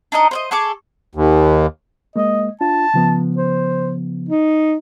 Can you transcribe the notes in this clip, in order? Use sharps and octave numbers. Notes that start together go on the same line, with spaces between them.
D4 D#4 A#4 D#5
C5 D5 D#5
G#4 A4 C#6 D6
D#2
G#3 A#3 D#5
D4 F4 A5
C#3 F3 B3
C5
D#4